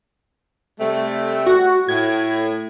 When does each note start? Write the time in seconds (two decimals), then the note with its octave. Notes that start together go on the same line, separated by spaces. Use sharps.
0.79 C3 G3 A3
1.47 F#4
1.88 A2 G#6